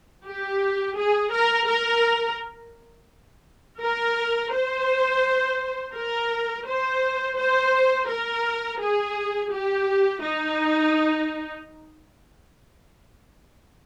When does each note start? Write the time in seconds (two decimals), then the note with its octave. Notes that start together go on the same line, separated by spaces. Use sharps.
0.26 G4
0.97 G#4
1.32 A#4
1.68 A#4
3.81 A#4
4.53 C5
5.94 A#4
6.67 C5
7.37 C5
8.08 A#4
8.80 G#4
9.52 G4
10.22 D#4